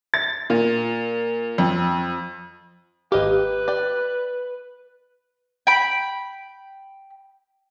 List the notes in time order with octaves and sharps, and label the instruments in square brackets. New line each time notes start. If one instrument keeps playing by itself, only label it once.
[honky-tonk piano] A6
A#2
F2
[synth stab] G#1 G4 [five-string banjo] A#3 D#5 F5 [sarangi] B4
[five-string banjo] D5 G5
[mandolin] G5 B5